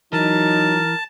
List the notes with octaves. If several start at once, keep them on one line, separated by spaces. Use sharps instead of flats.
E3 F#3 D#4 A#4 A5